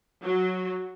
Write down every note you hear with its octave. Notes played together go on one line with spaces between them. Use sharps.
F#3